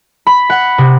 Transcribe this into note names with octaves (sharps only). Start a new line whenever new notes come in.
B5
F#5
C3